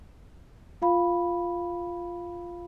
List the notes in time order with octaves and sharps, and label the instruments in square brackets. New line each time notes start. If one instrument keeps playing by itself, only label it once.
[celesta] F4 F5 B5